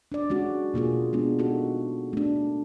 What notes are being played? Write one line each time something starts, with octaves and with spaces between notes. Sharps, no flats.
D4 D5
G#3 C#4 F#4
B2 A#3 F4 G#4
G#3 B3 D4
D#4 F#4 A4
A3 D4